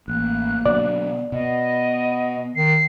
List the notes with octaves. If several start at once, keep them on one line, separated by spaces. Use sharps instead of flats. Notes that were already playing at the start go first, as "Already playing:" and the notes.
A1 A#3 F#6
B2 D3 F#3 D5
B2 B3 D#5
D#3 C7